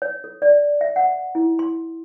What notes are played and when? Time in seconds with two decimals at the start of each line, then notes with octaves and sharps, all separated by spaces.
0.02 C#5
0.24 A4
0.42 D5
0.81 E5
0.96 F#5
1.35 E4
1.59 C6